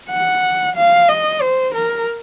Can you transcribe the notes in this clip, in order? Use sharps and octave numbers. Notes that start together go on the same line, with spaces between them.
F#5
F5
D#5
C5
A#4